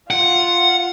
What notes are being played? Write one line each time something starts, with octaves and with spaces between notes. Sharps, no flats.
F4 F#5